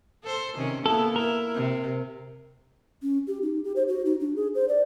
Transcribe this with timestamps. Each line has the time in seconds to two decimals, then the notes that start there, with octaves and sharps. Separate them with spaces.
0.23 A4 C5
0.57 C3 D#3 C#4
0.86 A#3 B3 E4 A4
1.16 E4 A#4
1.54 C3
3.02 C#4
3.28 G4
3.42 D#4
3.64 G4
3.76 C5
3.88 F#4
4.06 D#4
4.20 D4
4.36 G#4
4.55 C5
4.69 D5